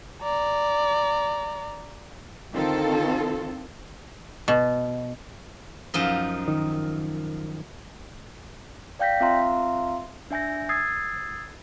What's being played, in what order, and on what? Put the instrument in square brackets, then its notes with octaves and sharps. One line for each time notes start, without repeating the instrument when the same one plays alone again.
[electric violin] D5 A#5
[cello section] D3 D#3 C4 F4 A4
[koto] B2
[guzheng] F#2 F3 D#4
[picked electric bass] D#3
[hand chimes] D5 F5 G5 G6 A#6 B6
C4 F4 E5 F5 A#5 C6
D4 E5 G#5 G6 A#6
D#6 E6 G#6 A6 C7